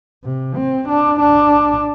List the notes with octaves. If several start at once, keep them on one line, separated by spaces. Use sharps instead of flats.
C3
C4
D4
D4